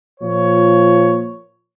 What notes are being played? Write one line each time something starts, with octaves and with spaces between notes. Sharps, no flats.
A#2 F3 C#5